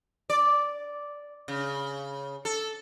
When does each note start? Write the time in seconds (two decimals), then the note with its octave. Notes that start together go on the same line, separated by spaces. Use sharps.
0.30 D5
1.48 C#3
2.45 A4